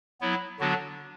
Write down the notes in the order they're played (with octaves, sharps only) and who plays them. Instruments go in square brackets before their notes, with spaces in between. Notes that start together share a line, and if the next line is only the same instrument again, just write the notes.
[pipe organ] F#3 B3 E4
D3 F#3 B3 D4 F#4